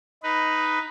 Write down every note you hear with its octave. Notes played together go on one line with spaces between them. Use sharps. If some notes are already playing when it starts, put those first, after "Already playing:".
D#4 B4